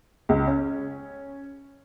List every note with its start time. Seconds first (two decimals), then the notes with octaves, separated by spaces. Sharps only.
0.29 C#2
0.47 C#4